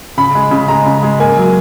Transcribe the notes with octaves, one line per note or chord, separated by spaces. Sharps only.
C#3 B5
G#3
C#3
G#3 A#5
C#3
G#3
A#3 G#5
F#3